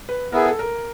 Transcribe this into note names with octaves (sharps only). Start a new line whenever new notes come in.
B4
B3 E4 G#4 A#4
A4
A#4